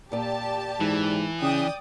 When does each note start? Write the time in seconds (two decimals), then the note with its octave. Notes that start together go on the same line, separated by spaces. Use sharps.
0.12 A#2 G4 D5 A5
0.80 G#2 E3
1.42 C#3 D5 G5 D#6